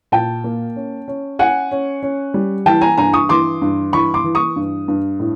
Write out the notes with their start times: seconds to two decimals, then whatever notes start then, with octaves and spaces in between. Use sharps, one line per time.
0.12 A#2 G5 A5
0.44 A#3
0.76 C#4
1.08 C#4
1.39 C#4 F#5 G#5
1.71 C#4
2.03 C#4
2.34 G3
2.66 E3 G5 A5
2.81 G#5 A#5
2.97 G2 G#5 A#5
3.13 C#6 D#6
3.29 E3 C6 D6
3.62 G2
3.93 E3 B5 C#6
4.14 C6 D6
4.24 E3
4.35 C#6 D#6
4.56 G2
4.88 G2
5.20 A2